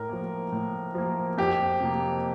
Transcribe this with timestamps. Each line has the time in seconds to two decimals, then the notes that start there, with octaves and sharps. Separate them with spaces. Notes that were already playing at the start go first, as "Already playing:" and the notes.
Already playing: A2 A#4
0.09 F3 A#3
0.52 A2
0.95 F3 A#3
1.38 F2 G4
1.81 C3 F3 A#3